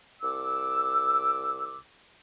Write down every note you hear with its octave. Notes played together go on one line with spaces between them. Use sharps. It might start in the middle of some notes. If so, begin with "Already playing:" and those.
C2 D6 E6